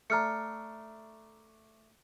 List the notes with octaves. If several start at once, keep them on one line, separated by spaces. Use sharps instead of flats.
A3 D4 A#5 F6 C#7